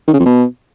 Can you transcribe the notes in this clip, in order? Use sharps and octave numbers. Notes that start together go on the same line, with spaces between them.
D#3
C#3
F2
B2